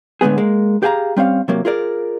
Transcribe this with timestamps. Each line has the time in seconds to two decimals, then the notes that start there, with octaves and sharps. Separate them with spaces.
0.21 A2 D3 G#3 B3 G#4
0.38 G#3 A#3
0.83 G4 G#4 F5 G#5 A#5
1.16 G3 C4 C#4 F5
1.48 C3 F#3 A#3
1.65 F4 G#4 A#4 D5